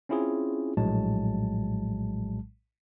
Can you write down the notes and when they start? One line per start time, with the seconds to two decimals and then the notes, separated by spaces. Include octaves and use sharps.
0.09 C4 C#4 E4 F4 G#4
0.77 A#1 A2 F#3 G#3 A5